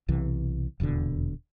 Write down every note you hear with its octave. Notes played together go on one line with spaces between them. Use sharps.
B1 C3 E3
D#1 E2 B2 D3